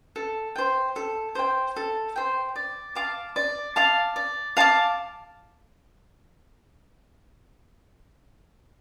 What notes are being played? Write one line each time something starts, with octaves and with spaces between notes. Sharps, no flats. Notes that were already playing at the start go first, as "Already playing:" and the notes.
A4
C5 G5
A4
C5 G5
A4
C5 G5
D5
F5 A5 D6
D5
F5 A5 D6
D5
F5 A5 D6